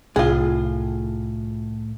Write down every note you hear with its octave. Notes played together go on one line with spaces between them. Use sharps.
C2 A2 F4 G#4